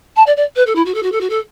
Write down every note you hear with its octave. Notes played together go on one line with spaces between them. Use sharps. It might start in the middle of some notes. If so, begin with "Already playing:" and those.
A5
D5
D5
B4
A4
E4
F#4
A4
F#4
A4
F#4
A4